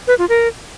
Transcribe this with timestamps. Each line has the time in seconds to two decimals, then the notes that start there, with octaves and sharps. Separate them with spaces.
0.07 B4
0.18 F4
0.29 A#4